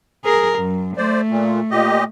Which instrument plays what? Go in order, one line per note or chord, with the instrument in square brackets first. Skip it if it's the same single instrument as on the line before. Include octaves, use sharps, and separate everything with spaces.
[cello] G#4 A#4
F#2
[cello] A3 [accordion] C5 D5
[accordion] A#2
A#2 G4 D#5